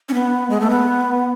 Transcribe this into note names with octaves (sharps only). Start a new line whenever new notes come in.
C#4
B3
G#3
A3
B3